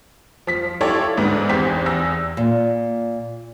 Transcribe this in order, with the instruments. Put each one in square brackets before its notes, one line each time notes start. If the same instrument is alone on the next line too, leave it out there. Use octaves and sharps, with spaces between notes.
[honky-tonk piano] F3 B6
E4 F4 G4 A4 C#5 D5
D2 G#2 B3 D4
G#1 E2 G4 C5 B6
E2 E6 A#6
[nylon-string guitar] A#2